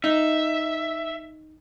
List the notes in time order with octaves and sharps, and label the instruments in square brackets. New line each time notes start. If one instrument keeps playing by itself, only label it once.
[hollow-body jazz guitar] D#4 [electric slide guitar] E5